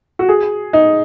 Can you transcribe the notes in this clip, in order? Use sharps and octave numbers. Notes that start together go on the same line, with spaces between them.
F#4
G#4
D#4